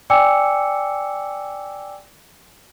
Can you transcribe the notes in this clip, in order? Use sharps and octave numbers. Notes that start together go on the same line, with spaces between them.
D5 G5 G#5 D6 E6 C#7